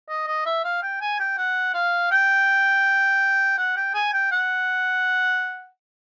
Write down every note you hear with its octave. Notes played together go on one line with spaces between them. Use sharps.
D#5
D#5
E5
F5
G5
G#5
G5
F#5
F5
G5
F#5
G5
G#5
G5
F#5